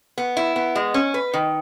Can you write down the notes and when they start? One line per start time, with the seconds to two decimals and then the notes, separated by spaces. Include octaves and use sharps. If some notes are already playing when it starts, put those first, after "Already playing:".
0.18 B3
0.37 E4
0.56 B3
0.75 G#3
0.94 C#4
1.14 B4
1.34 D#3